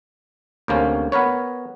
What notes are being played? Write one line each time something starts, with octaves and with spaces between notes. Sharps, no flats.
D2 C3 A#3 C#4
B3 A#4 B4 C#5